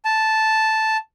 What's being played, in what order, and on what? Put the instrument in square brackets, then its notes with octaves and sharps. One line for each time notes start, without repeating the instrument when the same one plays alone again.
[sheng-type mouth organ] A5